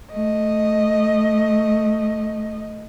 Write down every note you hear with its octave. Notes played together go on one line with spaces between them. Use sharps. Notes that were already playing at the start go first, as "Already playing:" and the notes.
A3 D#5